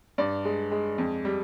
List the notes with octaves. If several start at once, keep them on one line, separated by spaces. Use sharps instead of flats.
G2 D5
G#3
G#3
F2
G3